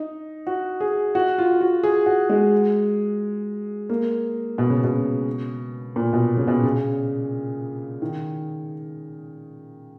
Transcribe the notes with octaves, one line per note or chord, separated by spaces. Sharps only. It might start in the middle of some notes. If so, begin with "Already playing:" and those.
Already playing: D#4
F#4
G#4
F#4
F4
F#4
G#4
F#4
G#3
A#3
B2
C#3
B2
A#2
B2
C#3
B2
C#3
D#3